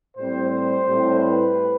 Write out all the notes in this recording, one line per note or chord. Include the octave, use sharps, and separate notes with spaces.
A2 G3 C4 C5
C5
A2 G3 C4
B4